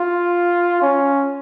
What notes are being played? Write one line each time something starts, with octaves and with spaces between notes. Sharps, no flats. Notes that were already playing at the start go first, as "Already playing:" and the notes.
Already playing: F4
C#4